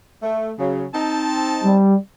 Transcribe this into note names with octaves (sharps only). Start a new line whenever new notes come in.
A3
C#3 F#3
C4 D#4 A5
G3